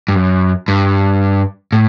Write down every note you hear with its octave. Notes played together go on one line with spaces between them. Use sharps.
G2
F#2
G2
A2